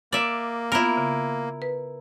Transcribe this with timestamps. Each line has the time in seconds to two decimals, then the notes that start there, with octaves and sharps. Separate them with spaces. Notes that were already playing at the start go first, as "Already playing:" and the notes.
0.12 A#3 D5 E5
0.72 B3 E4 F4 A#4
0.97 C#3
1.62 B4